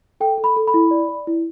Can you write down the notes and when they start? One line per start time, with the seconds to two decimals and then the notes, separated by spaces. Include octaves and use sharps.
0.20 A4 G5
0.38 A4
0.44 B5
0.56 A4
0.67 B5
0.74 E4
0.91 D5
1.09 D5
1.27 E4